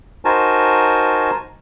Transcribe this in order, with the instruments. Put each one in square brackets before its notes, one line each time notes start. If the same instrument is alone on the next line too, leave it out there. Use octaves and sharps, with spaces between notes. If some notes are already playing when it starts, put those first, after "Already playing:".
[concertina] D#4 F#4 A#4 C5 G#5 A5